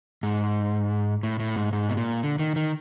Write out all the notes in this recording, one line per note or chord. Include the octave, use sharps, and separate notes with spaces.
G#2
A2
A2
G#2
G#2
B2
A#2
D3
D#3
D#3